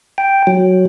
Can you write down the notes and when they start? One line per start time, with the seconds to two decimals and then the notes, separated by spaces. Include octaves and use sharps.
0.18 G5
0.47 F#3